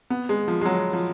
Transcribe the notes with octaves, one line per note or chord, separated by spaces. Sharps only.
B3
G#3
F3
G#3
F#3
F3